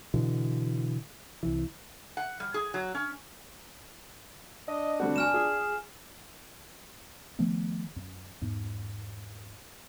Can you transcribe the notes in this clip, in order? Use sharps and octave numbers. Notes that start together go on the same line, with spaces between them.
B2 D3 E3
C2 E3
F#5
G3
G#4
F#3
C#4
D4 D#5
D3 G3 C4 F#4
G2 G#5 F6 E7
F4 G#4
D#3 F3 A3 B3
F#2
E2 G#2